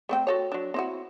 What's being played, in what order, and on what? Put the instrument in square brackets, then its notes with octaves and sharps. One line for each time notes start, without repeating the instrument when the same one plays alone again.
[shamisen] A3 C4 G5
F#4 A4 C#5
F#3 D4
C4 E4 F#4